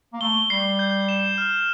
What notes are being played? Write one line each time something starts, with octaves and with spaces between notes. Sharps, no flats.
A#3
A3 G7
G3 C7
G6
E7
F6